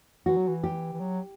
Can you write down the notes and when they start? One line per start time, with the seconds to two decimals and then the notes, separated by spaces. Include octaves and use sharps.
0.26 E3 F#4
0.37 F#3
0.48 E3
0.64 G4
0.93 E3
1.00 F#3